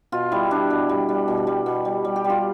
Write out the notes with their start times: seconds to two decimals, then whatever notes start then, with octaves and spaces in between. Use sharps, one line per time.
0.12 B2 F4
0.32 G3 E4
0.51 G3 D4
0.70 B2
0.89 G3
1.09 G3
1.28 B2
1.47 G3
1.66 B2
1.85 G3
2.05 G3
2.16 G4
2.24 G3
2.30 F4